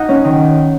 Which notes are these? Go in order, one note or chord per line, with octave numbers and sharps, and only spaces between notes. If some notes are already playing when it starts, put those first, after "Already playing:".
Already playing: D#4 F#5 A#5
C#4
D#3